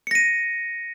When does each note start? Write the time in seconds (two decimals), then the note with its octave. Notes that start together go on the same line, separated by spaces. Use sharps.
0.07 C#7
0.11 A#6
0.15 D#7